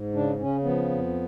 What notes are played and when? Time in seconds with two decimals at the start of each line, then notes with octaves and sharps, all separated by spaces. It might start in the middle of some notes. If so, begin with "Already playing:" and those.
Already playing: G#2
0.14 C#3 D4
0.39 C#3 C#4
0.64 F3 B3
0.90 F2